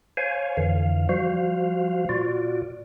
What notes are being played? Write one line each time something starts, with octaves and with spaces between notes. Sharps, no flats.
C5 C#5 F5 G#5
F2 D3 E3 F5
F3 G3 F#4 C5 F5
A#2 F4 F#4 D5